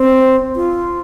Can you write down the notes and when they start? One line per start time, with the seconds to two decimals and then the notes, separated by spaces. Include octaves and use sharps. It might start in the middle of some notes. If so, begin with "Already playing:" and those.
Already playing: C4
0.56 F4